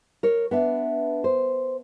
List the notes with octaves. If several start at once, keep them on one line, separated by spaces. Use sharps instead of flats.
A#4 C#5
B3 D4 E5
C5